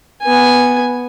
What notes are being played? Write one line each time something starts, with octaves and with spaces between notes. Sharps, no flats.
B3 G#5